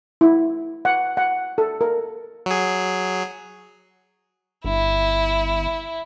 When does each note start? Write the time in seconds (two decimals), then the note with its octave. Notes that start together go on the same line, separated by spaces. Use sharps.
0.21 E4
0.85 F#5
1.17 F#5
1.58 A4
1.81 A#4
2.46 F#3 G#4
4.64 G1 E4